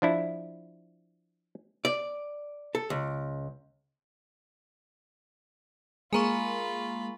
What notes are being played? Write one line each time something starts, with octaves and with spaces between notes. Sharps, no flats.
F3 D4 E4
D5
A4
C#2
G#3 A#3 F4 G#5 A#5 B5 C#6